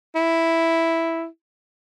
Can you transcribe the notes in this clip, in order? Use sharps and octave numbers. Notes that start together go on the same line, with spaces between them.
E4